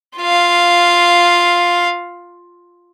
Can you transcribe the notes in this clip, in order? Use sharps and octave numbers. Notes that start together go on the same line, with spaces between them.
F4 F5